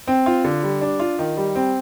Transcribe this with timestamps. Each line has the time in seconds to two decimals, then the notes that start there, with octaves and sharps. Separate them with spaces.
0.07 C4
0.26 F4
0.44 D3
0.63 G3
0.81 D4
1.00 F4
1.19 D#3
1.37 G3
1.56 C4